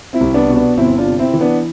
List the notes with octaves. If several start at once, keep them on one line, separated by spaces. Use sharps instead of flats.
C4 E4
C2
B3 D4
B2
B3 D4
G1 C4 E4
D4 F4
C3
C4 E4
E3
B3 D4